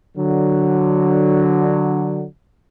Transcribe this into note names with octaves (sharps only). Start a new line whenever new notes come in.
D3 F#3